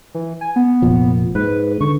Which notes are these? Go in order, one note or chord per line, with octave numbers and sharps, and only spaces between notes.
E3
G#5
B3
F1 A#2 F3
G#2 B4
D3 C#6